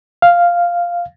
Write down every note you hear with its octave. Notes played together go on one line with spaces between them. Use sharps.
F5